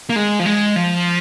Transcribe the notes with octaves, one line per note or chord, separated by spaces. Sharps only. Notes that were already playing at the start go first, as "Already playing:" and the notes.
A#3
G#3
F3
G#3
F3